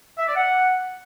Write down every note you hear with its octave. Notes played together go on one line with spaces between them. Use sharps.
E5
D5
F#5